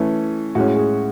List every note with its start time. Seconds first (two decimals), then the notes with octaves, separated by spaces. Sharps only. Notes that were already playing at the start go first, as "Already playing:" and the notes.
Already playing: E3 A3 C#4
0.55 A2 G#3 C#4 F#4
0.76 G#4